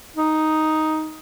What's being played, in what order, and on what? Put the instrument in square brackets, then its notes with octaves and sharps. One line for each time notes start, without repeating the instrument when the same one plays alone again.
[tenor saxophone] D#4